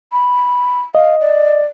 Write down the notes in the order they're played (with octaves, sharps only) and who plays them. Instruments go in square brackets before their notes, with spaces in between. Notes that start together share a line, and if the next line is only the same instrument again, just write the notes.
[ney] B5
[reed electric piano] D#5 [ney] F5
[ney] D5